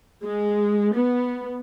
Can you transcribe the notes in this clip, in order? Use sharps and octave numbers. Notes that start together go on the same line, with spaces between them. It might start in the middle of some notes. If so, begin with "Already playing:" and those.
G#3
B3